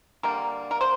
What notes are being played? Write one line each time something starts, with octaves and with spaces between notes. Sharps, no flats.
D3 G3 A#3 A#4
A#4
C5